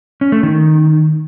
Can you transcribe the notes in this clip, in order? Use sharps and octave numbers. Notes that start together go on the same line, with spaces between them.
C#4
A3
D#3